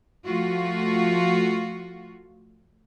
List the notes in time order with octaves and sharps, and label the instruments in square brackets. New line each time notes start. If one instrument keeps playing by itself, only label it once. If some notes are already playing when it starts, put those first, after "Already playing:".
[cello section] F3 A3 F4 F#4